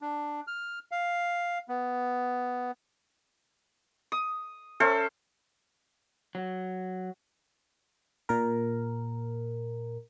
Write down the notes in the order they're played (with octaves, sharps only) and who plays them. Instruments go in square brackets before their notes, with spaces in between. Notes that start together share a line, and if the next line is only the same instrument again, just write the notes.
[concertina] D4
F6
F5
B3
[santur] D#6
C#4 A4 C5 E5
[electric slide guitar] F#3
[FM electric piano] A#2 A#4